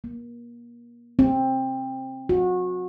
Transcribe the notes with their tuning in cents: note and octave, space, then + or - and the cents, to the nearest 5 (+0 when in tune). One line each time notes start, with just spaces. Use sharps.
A#3 +35
C4 +15
F#4 -30